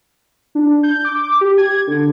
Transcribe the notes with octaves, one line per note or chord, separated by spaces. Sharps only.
D4
G6
D6
G4
G#6
D3